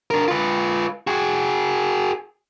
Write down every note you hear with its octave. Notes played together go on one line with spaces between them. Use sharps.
D4 A#4
F4 B4
F#4 G#4